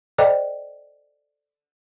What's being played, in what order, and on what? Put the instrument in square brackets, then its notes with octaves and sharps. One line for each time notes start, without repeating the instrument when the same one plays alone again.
[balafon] A4 C5 D5 D#5 G5